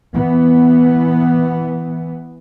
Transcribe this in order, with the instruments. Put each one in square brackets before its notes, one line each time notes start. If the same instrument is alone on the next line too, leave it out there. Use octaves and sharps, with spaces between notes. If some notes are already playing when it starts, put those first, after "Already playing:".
[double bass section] E3 B3